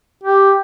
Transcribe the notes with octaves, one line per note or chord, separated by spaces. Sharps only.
G4